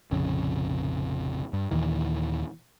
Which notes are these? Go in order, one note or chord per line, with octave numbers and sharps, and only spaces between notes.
F1 A#1 F2 C#3
G2
D#2 A#2 D#3 E3